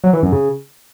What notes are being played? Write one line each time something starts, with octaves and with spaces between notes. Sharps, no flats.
F#3
E3
F#2
C#3